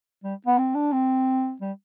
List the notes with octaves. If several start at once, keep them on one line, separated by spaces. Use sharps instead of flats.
G3
B3
C4
D4
C4
G3